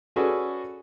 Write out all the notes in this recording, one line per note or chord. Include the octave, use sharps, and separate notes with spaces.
C#4 F#4 G#4 A4 B4 D5